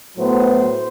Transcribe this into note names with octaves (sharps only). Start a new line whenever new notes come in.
A2 F#3 B3 C5